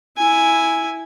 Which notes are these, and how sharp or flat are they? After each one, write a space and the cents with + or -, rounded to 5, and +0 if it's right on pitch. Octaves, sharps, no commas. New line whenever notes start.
E4 +0 G#5 +0